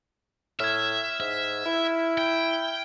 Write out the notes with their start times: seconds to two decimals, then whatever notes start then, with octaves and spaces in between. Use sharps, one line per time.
0.60 A2 E5 F6 G#6
1.20 G#2 E5
1.65 E4
2.18 G5